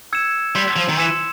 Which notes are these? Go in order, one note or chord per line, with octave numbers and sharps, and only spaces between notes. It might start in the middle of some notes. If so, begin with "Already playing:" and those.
E6 G#6 C#7 E7
G3 C6
F3
D#3
E3 E6 G#6 C#7 E7